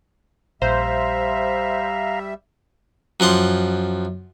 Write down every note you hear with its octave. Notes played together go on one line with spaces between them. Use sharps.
A#1 G3 C5 E5 F5 A#5
F#2 F3 F#5 C6